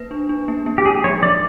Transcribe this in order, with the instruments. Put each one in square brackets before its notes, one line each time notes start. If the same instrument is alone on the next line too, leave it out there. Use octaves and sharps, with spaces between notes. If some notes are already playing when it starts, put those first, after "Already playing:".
Already playing: [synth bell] A#3 B4
D4
D4
A#3
A#3
[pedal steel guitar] G4
[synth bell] G#3 [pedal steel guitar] G#4
[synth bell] F3 [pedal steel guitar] C#5
[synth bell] F3 [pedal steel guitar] D5